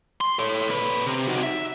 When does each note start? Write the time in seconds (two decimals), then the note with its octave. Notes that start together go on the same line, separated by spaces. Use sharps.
0.21 C6
0.39 A4 C#5
0.69 A#2 B4
1.06 C3
1.27 D#4 F#4
1.43 E5